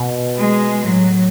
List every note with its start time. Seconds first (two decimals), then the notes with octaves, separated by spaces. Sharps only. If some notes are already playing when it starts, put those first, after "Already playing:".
Already playing: B2
0.37 G#3
0.84 A2 F#3